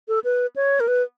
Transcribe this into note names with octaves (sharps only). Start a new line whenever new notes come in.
A4
B4
C#5
A#4
B4